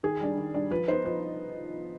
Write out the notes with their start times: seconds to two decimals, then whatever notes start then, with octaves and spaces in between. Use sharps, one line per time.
0.03 D#3 G#4
0.20 G3 D4
0.37 D#3
0.54 G3 D4
0.71 F3 B4
0.88 B3 D#4 C5
1.05 F3 B4